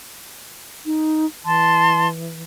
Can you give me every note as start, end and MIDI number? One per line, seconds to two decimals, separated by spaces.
0.86 1.26 63
1.44 2.43 52
1.44 2.08 81
1.44 2.08 84